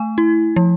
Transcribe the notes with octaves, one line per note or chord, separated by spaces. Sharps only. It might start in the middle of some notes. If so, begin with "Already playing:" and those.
Already playing: A3 G#5
E4
F3